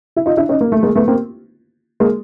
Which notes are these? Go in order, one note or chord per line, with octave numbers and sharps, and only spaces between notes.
E4
D#4 F4
D4 E4
C#4 D#4
A#3
A3
G#3 A#3
A3 B3
A#3 C4
G#3 A#3